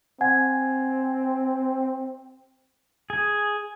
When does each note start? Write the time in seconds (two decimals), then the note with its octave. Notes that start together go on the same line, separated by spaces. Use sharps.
0.21 C4 F#5 G#5 G#6
3.10 G#4